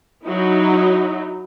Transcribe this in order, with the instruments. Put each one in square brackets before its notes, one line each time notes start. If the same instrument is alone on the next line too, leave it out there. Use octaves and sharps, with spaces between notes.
[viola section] F#3 D#4 E4